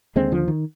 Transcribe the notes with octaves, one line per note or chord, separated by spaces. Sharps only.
D#2 D3 G#3 C4
D3 F3
D#3